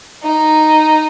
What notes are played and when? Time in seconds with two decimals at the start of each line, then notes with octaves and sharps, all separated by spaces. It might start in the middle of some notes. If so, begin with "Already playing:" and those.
0.23 D#4